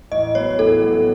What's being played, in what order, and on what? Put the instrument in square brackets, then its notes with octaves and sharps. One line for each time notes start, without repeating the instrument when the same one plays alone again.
[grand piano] A1 [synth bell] D#5
[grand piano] A2 F#3 B3 [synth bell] C#5
[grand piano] A1 [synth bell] A4
[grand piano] A2 F#3 B3